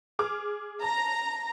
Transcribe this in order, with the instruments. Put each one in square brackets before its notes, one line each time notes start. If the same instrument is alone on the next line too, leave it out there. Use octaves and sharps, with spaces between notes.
[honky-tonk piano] G#4 D6 F6
[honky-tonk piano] A5 [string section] A#5